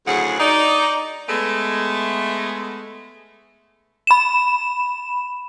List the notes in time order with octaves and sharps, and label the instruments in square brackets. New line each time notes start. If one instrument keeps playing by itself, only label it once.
[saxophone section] D2 A2 C#3 F#3 G#4 F#5
D#4 D5
G#3 A3 B3
[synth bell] B5 E7